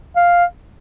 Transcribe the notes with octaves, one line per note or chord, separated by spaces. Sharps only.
F5